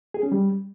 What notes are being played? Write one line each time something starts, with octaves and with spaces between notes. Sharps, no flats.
G#4
C#4
G3